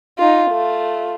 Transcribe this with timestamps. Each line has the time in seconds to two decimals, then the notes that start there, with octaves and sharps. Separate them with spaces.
0.18 D#4 F4
0.51 A3 F4